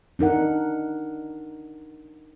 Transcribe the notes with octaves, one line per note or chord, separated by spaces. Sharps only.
D4 D#4 A#4 F#5